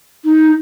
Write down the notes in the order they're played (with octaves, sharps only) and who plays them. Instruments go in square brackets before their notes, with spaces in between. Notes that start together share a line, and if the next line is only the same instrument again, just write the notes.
[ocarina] D#4